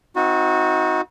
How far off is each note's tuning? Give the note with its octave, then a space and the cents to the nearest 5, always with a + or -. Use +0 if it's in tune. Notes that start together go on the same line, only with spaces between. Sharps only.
C4 +0 D#4 +30 F#4 -20